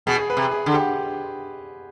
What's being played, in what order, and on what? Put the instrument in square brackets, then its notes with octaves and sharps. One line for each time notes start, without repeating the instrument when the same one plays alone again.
[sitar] B2 [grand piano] G#4
[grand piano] G#4
B4
[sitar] C3
[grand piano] G#4
[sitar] D3
[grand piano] G4